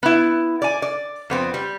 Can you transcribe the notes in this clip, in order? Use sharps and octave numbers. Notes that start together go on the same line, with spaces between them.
B3 E4
D5 G#5
D5
F2 B3 C4
G3